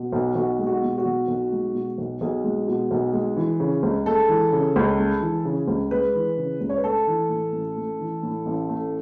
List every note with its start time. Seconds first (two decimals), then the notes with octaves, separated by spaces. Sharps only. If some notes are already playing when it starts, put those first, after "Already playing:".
Already playing: B2
0.13 B1
0.35 B1 F#4
0.59 G#3
0.67 F#4
0.82 B2
0.98 F#4
1.05 B1
1.28 B1
1.52 G#3
1.74 B2
1.98 B1
2.21 B1 G#4
2.44 G#3
2.68 B2
2.91 B1
3.13 G#3
3.37 E3
3.60 C#3
3.83 C#2
4.06 G#3 A4
4.29 E3
4.53 C#3
4.76 C#2
4.99 G#3
5.21 E3
5.45 C#3
5.68 C#2
5.91 G#3 B4
6.15 E3
6.38 C#3
6.61 C#2
6.69 C#5
6.77 B4
6.84 A3 A4
7.07 E3
7.29 A2
7.53 A1
7.76 A3
7.99 E3
8.23 A2
8.46 A1
8.69 A3